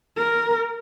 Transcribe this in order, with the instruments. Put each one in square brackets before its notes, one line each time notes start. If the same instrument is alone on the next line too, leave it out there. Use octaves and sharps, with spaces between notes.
[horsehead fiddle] A#4